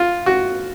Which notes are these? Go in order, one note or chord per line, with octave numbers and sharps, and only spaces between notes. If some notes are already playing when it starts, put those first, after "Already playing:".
Already playing: F4
F#4